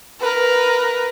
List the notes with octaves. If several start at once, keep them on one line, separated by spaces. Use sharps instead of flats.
A#4 B4